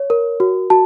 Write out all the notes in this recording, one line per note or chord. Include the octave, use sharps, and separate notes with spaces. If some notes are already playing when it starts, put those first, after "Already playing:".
Already playing: C#5
A#4
F#4
F#4 A5